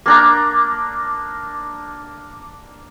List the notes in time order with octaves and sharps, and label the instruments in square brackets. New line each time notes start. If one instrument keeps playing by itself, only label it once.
[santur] A#3 D4 A#5